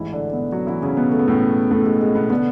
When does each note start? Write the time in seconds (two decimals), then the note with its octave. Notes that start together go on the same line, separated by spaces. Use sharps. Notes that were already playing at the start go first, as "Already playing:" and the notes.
Already playing: A1 G#2 E3 E4
0.13 D3 D4
0.33 B2 B3
0.52 F#3 F#4
0.67 E3 E4
0.82 C#3 C#4
0.97 B2 B3
1.12 A3
1.19 B3
1.28 A2 A3
1.71 A2 A3
1.86 G#3
2.01 G#3
2.15 B2 B3
2.30 B2 D3 B3